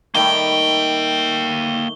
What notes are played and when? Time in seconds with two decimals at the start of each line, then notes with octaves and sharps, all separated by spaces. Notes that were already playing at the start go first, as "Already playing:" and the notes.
0.15 D#3 G3 A3 A#3 G5 G7